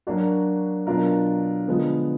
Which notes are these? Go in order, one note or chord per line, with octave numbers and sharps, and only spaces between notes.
F#3 A#3 D4 F#4
B2 F#3 D4 F4 A#4
D3 F3 G#3 B3